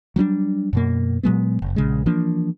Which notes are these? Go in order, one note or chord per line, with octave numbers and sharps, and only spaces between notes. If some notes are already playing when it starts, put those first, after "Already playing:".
F#3 G3 C#4 D4
F#2 B2 A#3
A#2 F#3 G#3 B3
F#1
A#1 C#3 G#3
E3 F3 A#3 D4